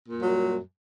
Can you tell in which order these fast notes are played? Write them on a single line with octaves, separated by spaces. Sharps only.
A#2 F#2 G3 F#3